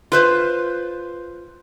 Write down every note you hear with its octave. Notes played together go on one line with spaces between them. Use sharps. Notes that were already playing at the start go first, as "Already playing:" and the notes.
F4 B4 C5